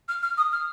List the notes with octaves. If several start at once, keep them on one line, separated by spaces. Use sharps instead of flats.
F6
F6
D#6
F6